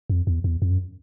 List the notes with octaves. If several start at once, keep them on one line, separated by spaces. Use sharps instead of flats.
F2
E2
E2
F2
F#2